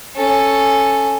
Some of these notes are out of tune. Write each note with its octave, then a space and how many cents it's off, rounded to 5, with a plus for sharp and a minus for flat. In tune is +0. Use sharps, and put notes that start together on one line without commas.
C#4 +0 A4 +0